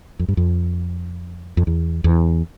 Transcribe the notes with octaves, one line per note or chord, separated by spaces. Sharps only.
F2
G2
F2
F2
E2
E2